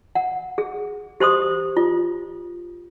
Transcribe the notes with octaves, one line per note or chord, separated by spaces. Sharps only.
F#5
G#4
G4 C5 C6 D#6
F4